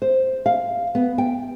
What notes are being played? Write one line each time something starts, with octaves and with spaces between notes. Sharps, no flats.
C5
F5
B3
G5